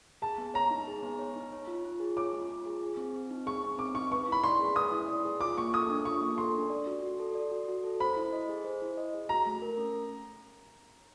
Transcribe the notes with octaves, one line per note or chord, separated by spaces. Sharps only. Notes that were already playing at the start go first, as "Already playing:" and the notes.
G#4 A5
B3
C#5 A#5
D#4
G#4
B3
C#5
D#4
C#5
F4
F4
G#4
C#5 D6
F4
F4
G#4
G#4
C4
C4
D#4
G#4 C#6
C4
C4 D6
D#4 C#6
B4 C#6
E4 B5
D5 C6
G#4
B4 D#6
E4
D5
G#4
F4 D6
A#3 C#6
A4 D#6
D4
F4 C#6
A#3
A4 C6
D4
D5
F#4
F#4
A4
D5
F#4
F#4
A4
C5 B5
E4
D#5
G#4
C5
E4
D#5
G#4
F#4 A#5
A3
A#4
C#4